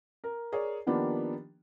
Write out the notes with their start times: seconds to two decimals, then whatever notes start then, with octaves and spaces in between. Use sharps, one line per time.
0.24 A#4
0.52 G#4 A#4 C#5 D5
0.87 D#3 F3 A#3 B3 D4 G4